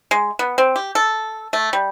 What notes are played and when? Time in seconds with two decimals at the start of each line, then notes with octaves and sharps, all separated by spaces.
0.11 G#3
0.39 B3
0.58 C4
0.76 G4
0.95 A4
1.53 A3
1.73 G3